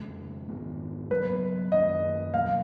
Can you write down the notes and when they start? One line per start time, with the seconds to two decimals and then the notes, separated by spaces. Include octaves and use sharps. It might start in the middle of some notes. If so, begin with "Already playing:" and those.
Already playing: F2 C#3 G#3
0.49 G#2 D#3 G#3 B3
1.10 C#3 F#3 B3 B4
1.72 F#2 D#3 A#3 C#4 D#5
2.34 B2 F#3 A#3 F5